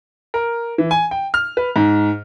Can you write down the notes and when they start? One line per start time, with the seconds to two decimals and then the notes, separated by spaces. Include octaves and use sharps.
0.34 A#4
0.78 E3
0.91 G#5
1.11 G5
1.34 F6
1.57 B4
1.76 G#2